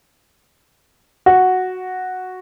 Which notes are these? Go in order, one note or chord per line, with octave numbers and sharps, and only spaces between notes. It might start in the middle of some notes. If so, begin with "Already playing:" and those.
F#4